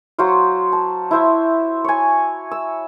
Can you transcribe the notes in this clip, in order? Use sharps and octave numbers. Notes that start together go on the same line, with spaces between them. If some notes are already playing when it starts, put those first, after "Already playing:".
F#3 F#4 C5 F5
A5
E4 C5 E5
C#5 G#5
E6